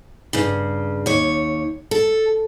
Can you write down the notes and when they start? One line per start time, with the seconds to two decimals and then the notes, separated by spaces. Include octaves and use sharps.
0.33 G2 C#3
1.06 D#2 C#5
1.91 A4